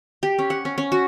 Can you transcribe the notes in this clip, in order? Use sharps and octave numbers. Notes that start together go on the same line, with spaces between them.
G4
C#4
F#5
C#4
C#4
F#4